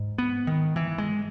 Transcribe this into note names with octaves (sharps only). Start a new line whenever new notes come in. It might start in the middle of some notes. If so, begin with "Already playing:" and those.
Already playing: G#2
B3
D#3
E3
G#3